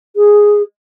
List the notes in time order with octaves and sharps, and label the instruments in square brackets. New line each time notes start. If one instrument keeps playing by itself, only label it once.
[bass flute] G#4